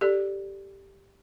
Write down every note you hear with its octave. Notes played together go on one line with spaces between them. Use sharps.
G4 A4 D5